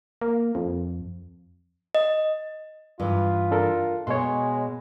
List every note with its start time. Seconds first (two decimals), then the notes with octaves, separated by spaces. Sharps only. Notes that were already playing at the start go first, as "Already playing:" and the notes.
0.21 A#3
0.55 F2
1.95 D#5
3.00 G2 E3 F4
3.51 D4 A4 A#4
4.07 B2 G#3 C#5 C6